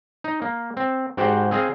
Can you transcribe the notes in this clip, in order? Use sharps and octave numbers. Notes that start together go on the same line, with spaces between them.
D#4
A#3
C4
G#2 F#4 G4 C5 F#5 G5
C4 G#4 D#5 F5 G#5